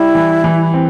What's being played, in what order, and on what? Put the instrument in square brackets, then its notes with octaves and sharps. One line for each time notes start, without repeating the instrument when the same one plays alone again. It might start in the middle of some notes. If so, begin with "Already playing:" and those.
Already playing: [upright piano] G3 [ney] E4
[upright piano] E3
E3
C4